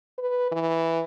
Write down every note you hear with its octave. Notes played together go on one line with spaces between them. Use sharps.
B4
E3